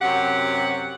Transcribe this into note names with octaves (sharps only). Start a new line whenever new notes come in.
F#2 C3 F#3 G4 F#5